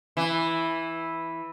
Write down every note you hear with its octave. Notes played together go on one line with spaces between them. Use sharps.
E3